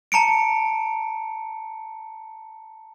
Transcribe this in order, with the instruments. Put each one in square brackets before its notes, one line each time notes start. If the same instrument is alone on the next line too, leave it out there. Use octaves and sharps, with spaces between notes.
[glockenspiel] A5 A#5 C#7 D7